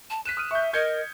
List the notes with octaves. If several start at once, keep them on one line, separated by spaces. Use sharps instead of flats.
A5
F#6 B6 D#7 E7
D#6 F6 D#7
E5 C#6 G6
A#4 D#5 G6 G#6 C#7